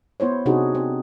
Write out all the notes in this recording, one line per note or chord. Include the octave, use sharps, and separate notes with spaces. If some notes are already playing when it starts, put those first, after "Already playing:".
B3 E4 C5 C#5
C3 D4 D#4 F#4 G#4
C4